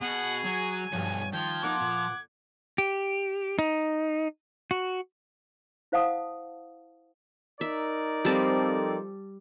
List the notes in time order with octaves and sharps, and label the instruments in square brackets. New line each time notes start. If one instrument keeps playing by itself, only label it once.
[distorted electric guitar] B2 [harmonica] G#4 [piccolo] F#5
[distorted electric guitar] F#3 [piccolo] G#5
[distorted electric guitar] B1 [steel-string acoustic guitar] G2 F3 C#5
[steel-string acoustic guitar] D#3 [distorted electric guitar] F3 [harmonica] G5 [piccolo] G#6
[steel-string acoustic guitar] A#3 B3 D#4 [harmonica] F#5 D6
[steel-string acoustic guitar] A#2
[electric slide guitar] G4
D#4
F#4
[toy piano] E4 C5 F5 F#5 A5 D#6
[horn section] D#4 A#4 D5 [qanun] E5
[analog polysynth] F3 C4 A4 [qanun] G3 A5